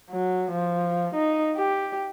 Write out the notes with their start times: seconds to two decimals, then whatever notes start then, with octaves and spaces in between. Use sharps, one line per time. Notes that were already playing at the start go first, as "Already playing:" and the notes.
0.10 F#3
0.51 F3
1.14 D#4
1.56 G4